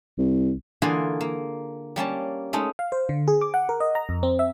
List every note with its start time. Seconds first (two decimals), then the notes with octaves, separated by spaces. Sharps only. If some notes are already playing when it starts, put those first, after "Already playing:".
0.18 C2
0.82 D3 E3 A#3 F4 G#4 A#4
1.21 A#3
1.96 G3 A#3 C#4 A5
2.53 G#3 A3 C#4 D#4
2.79 F5
2.92 C5
3.09 D3
3.28 G#4
3.41 D6
3.54 F#5
3.69 A#4
3.80 D#5
3.95 A#5
4.09 F2
4.23 C4
4.39 E5